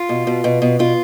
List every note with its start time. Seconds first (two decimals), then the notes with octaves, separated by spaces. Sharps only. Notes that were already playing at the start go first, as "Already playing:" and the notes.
Already playing: F4
0.09 B2
0.27 B2
0.44 B2
0.62 B2
0.79 B2 F4